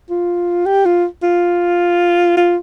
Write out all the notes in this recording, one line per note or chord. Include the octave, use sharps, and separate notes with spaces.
F4
G4
F4
F4
F4